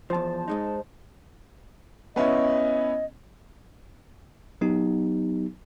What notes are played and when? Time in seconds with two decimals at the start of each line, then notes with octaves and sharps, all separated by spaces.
0.10 E2 F3 C5 A5
0.48 G#2 G#3 D#4
2.16 B3 C#4 E4 D#5
4.61 F#3 B3 D#4 G4